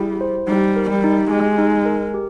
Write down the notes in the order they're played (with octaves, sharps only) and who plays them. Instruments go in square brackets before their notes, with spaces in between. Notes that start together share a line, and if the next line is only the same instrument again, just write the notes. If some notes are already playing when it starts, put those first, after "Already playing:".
Already playing: [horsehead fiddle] G3 [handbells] E4 G#4
[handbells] C5
[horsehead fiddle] G3 [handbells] D#4
[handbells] A#4
[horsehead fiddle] G3
[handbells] D#4
[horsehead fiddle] G#3 [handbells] G4
[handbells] D#4
A#4
G4